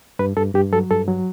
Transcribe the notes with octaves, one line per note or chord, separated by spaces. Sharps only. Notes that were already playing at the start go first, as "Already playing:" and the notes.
G2 B4
G2 A4
G2 G4
F#3 A4
G2 A4
F#3